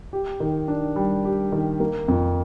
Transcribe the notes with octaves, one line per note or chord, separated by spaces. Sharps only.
G4
D#3
D4
G3
G4
D#3
A#3
F2